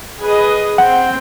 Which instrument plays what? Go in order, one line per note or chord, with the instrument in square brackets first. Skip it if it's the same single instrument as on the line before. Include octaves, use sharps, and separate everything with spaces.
[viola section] G#4 B4 D#5
[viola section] C4 G5 [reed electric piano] F#5